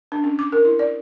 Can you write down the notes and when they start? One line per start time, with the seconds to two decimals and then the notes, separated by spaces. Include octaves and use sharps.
0.12 D4
0.24 C#4
0.39 D6
0.52 A#4
0.65 E4
0.79 D5